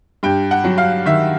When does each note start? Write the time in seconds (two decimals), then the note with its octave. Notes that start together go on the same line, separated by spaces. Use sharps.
0.23 G2 G5
0.51 F#5
0.64 F#3
0.78 F5
1.06 D#3 E5